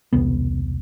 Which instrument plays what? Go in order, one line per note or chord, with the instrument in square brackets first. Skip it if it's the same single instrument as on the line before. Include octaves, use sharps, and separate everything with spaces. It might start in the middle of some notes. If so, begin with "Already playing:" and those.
[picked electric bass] E1 C2 B3